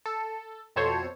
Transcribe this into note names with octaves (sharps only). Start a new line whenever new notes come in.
A4
F2 B2 A4 C5 C#5 G#6